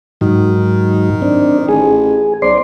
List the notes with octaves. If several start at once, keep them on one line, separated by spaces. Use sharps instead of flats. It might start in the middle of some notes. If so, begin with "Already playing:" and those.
G#2 D#3 F#3
C4 D4
A1 G#4
B1 C5 D5 C6